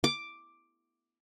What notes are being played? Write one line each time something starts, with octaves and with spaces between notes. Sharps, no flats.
D6